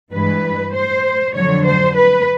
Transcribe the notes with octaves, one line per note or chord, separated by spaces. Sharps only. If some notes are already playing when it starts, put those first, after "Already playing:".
G2 E3 G#3 B4
C5
F2 D3 F#3 C#5
C5
B4